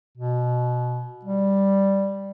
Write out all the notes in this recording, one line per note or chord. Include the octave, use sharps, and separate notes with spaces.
B2
G3